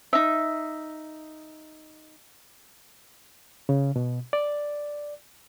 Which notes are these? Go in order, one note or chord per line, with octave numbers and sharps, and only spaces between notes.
D#4 E5
C#3
B2
D5